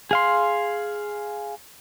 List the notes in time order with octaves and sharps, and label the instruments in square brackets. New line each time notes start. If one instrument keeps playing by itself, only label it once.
[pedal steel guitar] G#4 F5 C6